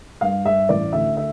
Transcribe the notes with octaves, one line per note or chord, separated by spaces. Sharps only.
G2 F5
G2 E5
A1 D5
D2 E5
D3 E5